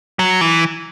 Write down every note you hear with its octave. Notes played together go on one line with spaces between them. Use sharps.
F#3
E3